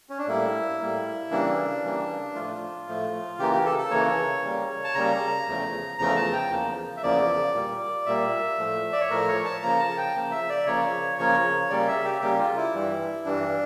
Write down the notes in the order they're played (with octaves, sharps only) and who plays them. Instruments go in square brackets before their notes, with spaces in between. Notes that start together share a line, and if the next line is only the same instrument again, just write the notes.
[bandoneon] C#4
D4
A2 G3 A#3 E4
A2 G3 A#3
C#3 E3 G3 A#3 D4
C#3 E3 G3 A#3
A2 F3 A3 F4
A2 F3 A3
C#3 E3 A#3 G4
G4
A4
A4
C#3 E3 A#3 C#5
C#3 G3 A#3
A5
C#3 G3 A#3 A#5
E2 C#3 F3 A3
E2 C#3 F3 A3 A#5
A5
G5
E2 C#3 F3 A#3
E5
E2 C#3 F3 A#3 D5
A#2 G3 A#3
A#2 G3 A#3 E5
A2 F3 A3
D5
C#5
A2 F3 A3 A#4
C#5
A5
C#3 F3 A#3 A#5
A5
G5
C#3 F3 A#3
E5
D5
C#3 F3 A#3 C#5
C#3 F3 A#3 C#5
C#3 G3 A#3 D5
E5
G4
C#3 G3 A#3 G4
F4
E4
G2 E3 G3
G2 E3 G3 D4